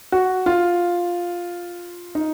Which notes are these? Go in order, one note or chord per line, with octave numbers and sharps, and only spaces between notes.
F#4
F4
D#4